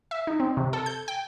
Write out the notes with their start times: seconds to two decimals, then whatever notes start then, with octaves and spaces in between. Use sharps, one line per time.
0.11 E5
0.27 D#4
0.40 C4
0.57 C3
0.73 A4
0.86 G6
1.08 G5